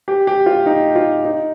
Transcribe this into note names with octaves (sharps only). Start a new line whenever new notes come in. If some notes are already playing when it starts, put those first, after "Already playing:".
G4
G4
F4
D#4
F4
D#4